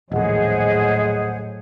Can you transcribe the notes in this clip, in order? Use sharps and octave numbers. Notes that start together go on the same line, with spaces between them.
D#1 A#1 A2 F#3 G#4 C5 D#5 F#5